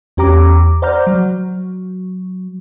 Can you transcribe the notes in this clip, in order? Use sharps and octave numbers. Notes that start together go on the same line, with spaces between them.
E2 C#4 G4 A#5 D6
C5 D5 F#5 A#5 F6 G6
F#3